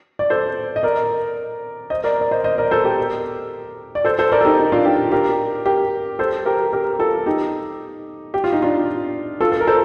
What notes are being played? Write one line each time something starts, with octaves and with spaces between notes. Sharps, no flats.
D5
A4 C5
D#5
A#4 D5
C5 D#5
A#4 D5
D5
C5 D#5
C5 D#5
A#4 D5
A4 C5
G4 A#4
D5
A4 C5
A4 C5
A#4 D5
A4
D#4 G4
D#4
D4 F4
D#4 G4
G4 A#4
G4 A#4
A4 C5
G4 A#4
G4 A#4
F4 A4
D#4 G4
G4
F4
D#4
D4 F4
F4 A4
A4
A#4
A4 C5